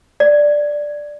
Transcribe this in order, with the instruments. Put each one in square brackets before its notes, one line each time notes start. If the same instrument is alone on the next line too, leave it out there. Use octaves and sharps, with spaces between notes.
[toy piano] D5